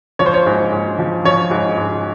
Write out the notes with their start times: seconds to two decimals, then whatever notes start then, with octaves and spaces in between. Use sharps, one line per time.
0.19 F3 C#5
0.26 C5
0.34 C#5
0.46 G#2
0.73 G#2
0.99 F3
1.24 F3 C#5
1.51 G#2
1.77 G#2